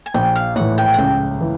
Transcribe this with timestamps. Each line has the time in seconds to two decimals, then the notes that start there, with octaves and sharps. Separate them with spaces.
0.06 G#5
0.14 A#1 G5
0.35 F5
0.56 A2 E3 F#5
0.78 G5
0.94 F#5
0.98 C#2 G5
1.41 E3